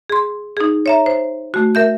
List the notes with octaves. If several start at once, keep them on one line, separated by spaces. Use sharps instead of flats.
G#4 C6
D#4 G#4
C#5 E5 A#5
C5
A3 F#4
A#4 E5 G6